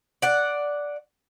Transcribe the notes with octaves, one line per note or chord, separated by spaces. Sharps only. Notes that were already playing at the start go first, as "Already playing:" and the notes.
D5 F#5